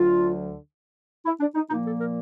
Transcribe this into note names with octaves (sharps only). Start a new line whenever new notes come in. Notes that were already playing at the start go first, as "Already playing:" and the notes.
Already playing: D2 D3 F#3 F4
E4
D4
D#4
A#2 F3 A#3 D#4
A4
A#4